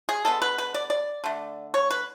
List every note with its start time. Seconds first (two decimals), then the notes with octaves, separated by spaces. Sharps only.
0.09 G#4
0.25 D3 G#3 B3 A4
0.42 B4
0.58 B4
0.74 D5
0.90 D5
1.24 D3 A3
1.74 C#5
1.90 B4